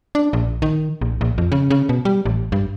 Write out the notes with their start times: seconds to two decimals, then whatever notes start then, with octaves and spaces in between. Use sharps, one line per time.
0.15 D4
0.33 A#1
0.62 D#3
1.01 A#1
1.21 A#1
1.38 F2
1.52 C#3
1.70 C#3
1.89 B2
2.05 G3
2.25 A1
2.52 G2